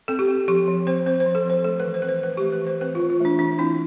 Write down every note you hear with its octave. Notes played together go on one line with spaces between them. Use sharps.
C4 A4
G4
C4
F3 G4
F3
C4 C5
C4 C5
C5
F3
A4
F3 C5
A3 A4
B4
E3
C5
C4 B4
C5
E3 B4
A3 G4
B4
E3
C5
C4 B4
E3 F4
F4
A3 D4
E3 D4
C4 E4